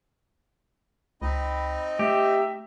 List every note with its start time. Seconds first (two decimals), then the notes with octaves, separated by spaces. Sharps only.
1.22 C#2 C4 D#4 D#5 B5
1.99 A3 G4 E5